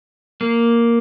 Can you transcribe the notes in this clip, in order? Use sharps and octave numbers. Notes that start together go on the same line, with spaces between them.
A#3